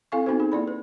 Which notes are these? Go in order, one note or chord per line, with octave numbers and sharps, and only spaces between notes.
C4 E4 A4 F5 G#5 C#6
B3 C4 D#4 F#4 A4 C5
D#4 G#4
A#3 E4 D5 B5
B4